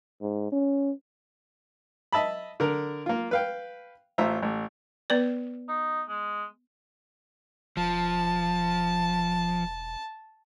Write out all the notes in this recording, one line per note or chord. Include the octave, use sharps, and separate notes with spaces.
G#2
C#4
D#5 E5 A5 B5
D3 A#4
A#3 F4
B4 F5 G5
A1 F4 C5 E5 A#5
A1
B3 B4 D5
D#4
G#3
E1 F3 A5